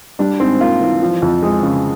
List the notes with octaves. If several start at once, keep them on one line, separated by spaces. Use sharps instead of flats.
G3 D4
G#2 C4
A#3 F4
E3
F3
F2
G#3
C#3